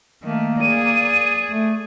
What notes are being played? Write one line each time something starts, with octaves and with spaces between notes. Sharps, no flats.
D#3 A3 A#3
G#4 D5 D#7
A3